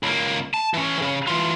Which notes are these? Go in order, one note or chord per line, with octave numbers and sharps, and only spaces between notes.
C#2 A#3
A5
E3 C#4
C#3 E3
E3 F4